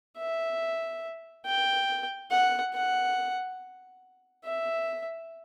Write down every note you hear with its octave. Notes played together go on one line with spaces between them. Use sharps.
E5
G5
F#5
F#5
E5